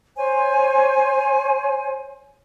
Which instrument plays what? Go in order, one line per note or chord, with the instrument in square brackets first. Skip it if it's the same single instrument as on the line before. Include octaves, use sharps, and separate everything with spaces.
[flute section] C5 C#5 G#5